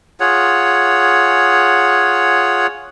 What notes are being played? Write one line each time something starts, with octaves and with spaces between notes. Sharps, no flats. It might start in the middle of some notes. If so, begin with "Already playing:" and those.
F4 G#4 C#5 F#5